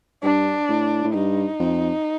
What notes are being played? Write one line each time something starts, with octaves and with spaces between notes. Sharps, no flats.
G2 D4
A2
A2
G2 D#4
F2